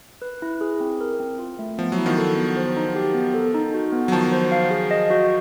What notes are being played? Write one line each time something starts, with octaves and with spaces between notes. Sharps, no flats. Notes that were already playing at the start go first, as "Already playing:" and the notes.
B4
E4
G#4
C4
A#4
C4
F4
A3
F3 B3
F#3
E4
D#3 F3
A4
B3
C5
D#4
G4
B3
A4
D#4
F#4
B3
F#3
D#3 F3 A5
C5
F5
G#4
D#5
F#4